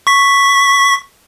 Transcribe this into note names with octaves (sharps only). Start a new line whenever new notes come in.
C#6 B6